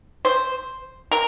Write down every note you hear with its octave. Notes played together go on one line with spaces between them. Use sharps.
C5
A#4